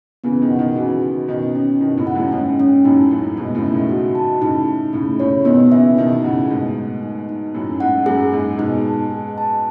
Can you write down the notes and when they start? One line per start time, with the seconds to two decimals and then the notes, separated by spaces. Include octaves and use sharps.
0.24 C#3 E3 B3
0.42 B2 D#3
0.51 F#5
0.59 B2 D#3
0.76 C#3 E3 F#4
1.02 F#4
1.28 B2 D#3 C#4
1.55 C#4
1.81 B2 D#3 E4
1.97 A2 C#3
2.07 F#5
2.15 F#2 A2
2.32 G#2 C#4
2.60 C#4
2.85 F#2 A2 D#4
3.11 F#2 A2 D#4
3.37 G#2 B2 A3
3.55 A2 C#3
3.63 E5
3.71 B2 D#3
3.89 F#4
4.15 A5
4.41 A2 C#3 D#4
4.68 D#4
4.93 A2 C#3 A3
5.20 A2 C#3 C#5
5.45 B2 D#3 B3
5.72 C#3 E3 E5
5.98 B2 D#3 D#4
6.24 A2 C#3 F#5
6.50 G#2 B2 A3
6.76 A3
7.03 D#4
7.29 D#4
7.54 F#2 A2 C#4
7.80 G#2 F#5
8.06 F#2 G#4
8.32 G#2 G#4
8.58 G#2 B2 D#4
8.85 A5
9.10 G#4
9.38 A5